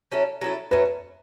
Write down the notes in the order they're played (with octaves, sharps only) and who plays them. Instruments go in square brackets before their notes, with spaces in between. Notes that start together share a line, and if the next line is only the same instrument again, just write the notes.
[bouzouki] F#3 C#4 E4 A4
F#3 C#4 E4 A4
[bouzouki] F#3 A3 C#4 [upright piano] B4